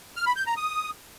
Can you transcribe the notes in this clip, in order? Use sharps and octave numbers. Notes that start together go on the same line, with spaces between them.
F6
B5
G6
A#5
D#6